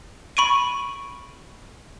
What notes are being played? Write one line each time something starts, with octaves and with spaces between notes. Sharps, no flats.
B5 C#6 D7 D#7